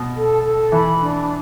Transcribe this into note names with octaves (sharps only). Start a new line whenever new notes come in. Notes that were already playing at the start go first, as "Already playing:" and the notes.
Already playing: B2
A4
A4
E3 B5
D4